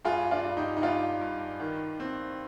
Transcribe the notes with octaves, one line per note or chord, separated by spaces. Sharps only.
G2 F4 G#4
D4 F4
G2
D#4 G4
D#4
G2 D4 F4
G2
D#3
C4